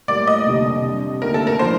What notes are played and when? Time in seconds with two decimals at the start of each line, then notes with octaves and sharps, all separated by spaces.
0.08 A2 G3 A#3 D5
0.27 D#5
0.46 F1 D#2 D3 G3
0.84 C3 G3 D4
1.21 D#2 D3 A3 A#4
1.34 A4
1.47 A#4
1.59 A2 F3 A3 D4 C5